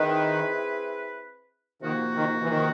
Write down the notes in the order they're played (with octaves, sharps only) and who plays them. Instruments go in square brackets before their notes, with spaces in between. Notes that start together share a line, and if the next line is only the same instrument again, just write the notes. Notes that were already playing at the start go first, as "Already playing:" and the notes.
Already playing: [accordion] D#3 [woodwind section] C4 E4 G#4 B4
[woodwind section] C3 F3 A#3 D#4 F#4 [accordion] D#3
[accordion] D#3
E3
D#3